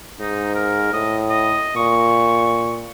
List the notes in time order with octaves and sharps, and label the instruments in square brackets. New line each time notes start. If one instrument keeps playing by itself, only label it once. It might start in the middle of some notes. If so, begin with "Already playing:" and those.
[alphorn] G#2 [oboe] D#4
[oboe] A#4
[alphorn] A2 [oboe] D#5
[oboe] D#5
[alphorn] A#2 [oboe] C#6